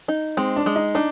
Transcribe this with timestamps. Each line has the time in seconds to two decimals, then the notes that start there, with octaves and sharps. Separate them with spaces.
0.08 D#4
0.37 G#3 C4
0.56 D4
0.66 G#3
0.76 D#4
0.95 D4 D#4